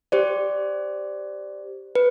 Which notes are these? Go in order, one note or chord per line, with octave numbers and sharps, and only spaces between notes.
G4 C5 D5
B4